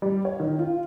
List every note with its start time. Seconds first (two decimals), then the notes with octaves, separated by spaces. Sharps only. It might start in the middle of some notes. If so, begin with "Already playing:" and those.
0.02 G3
0.25 C#5
0.40 D#3
0.59 F4